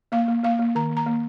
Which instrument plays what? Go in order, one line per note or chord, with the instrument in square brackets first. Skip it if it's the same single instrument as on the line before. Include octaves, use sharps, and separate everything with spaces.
[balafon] A#3 F5
A#3
A#3 F5
A#3
D#3 A#5
A#3
A#5
A#3